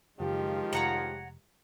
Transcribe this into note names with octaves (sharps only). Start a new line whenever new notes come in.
F#1 D#3 F3 G#3 F4 G4
F1 C#5 F#5 A#5